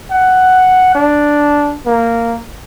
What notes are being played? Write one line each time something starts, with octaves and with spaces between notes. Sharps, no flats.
F#5
D4
A#3